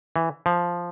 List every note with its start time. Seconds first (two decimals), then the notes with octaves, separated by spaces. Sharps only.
0.16 E3
0.46 F3